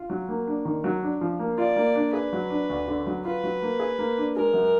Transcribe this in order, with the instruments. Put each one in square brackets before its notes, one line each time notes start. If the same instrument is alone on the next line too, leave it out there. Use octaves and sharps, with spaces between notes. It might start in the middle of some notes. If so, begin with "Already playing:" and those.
Already playing: [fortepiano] F4
F#3
A#3
D4
D#3
F#3
D4
F3
A#3
[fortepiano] F4 [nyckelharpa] D5
[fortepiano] A#3
D4
[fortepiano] G#4 [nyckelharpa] B4
[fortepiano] F#3
D4
D2
D3
F#3
[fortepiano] F4 [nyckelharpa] B4
[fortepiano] F#3
A#3
G#4
A#3
D4
[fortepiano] G#3 [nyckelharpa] A#4
[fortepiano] F#2